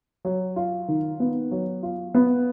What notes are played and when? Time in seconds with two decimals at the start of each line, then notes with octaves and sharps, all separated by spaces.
0.25 F#3
0.56 F4
0.88 D#3
1.20 B3
1.51 F#3
1.83 F4
2.15 B3